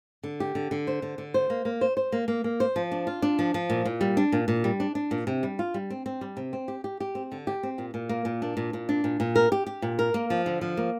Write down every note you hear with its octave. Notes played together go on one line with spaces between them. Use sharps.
D3
G4
D3
D3
C5
D3
D3
C5
A#3
A#3
C5
C5
A#3
A#3
A#3
C5
F3
D4
F4
D4
F3
F3
A#2
A#2
G3
D4
A#2
A#2
G3
D4
D4
A#2
C3
G3
F4
G3
C4
C4
G3
C3
C4
G4
G4
G4
C4
D3
G4
C4
A#2
A#2
A#3
A#2
D4
A#2
A#2
D4
A#2
A#2
A#4
G4
G4
A#2
A#4
A#3
F3
D3
F3
A#3